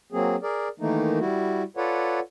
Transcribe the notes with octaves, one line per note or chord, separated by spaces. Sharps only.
F#3 A#3 C4 G#4
G#4 A#4 D5
D#3 E3 A3 A#3 D#4
G3 E4 F#4
F4 A4 B4 C#5 D5 F#5